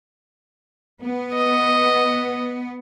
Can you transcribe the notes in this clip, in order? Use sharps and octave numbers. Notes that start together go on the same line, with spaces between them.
B3
D#5